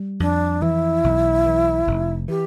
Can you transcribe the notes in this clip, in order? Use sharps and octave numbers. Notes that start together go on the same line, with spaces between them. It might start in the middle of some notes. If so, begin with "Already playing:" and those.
Already playing: G3
F2 D4
E3 E4
B1
E3
F1
E3 G4